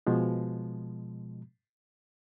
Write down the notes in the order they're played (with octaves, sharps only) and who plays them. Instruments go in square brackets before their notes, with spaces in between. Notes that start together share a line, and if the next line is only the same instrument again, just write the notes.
[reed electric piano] B2 F3 G#3